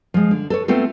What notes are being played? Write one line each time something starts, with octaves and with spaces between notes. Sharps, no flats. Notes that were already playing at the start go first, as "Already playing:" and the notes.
F3 G#3
D3
A4 B4 C#5
A3 B3 C4 F4 A4